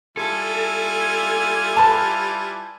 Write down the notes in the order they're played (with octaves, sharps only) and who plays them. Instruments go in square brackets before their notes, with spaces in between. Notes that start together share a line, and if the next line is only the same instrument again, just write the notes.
[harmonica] G3 E4 F4 [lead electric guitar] A4 [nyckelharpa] G#5
[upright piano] B4 A5